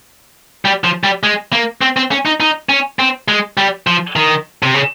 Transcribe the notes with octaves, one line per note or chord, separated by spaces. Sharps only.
G3
F3
G3
G#3
A#3
C4
C4
C#4
D#4
D#4
C#4
C4
G#3
G3
F3
D#3
C3
C#3